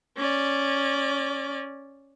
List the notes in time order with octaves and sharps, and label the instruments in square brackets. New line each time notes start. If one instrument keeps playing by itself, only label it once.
[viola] C#4 D5